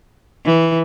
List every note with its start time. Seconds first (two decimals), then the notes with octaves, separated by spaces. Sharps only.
0.45 E3